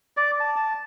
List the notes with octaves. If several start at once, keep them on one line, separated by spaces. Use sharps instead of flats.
D5
A5
A5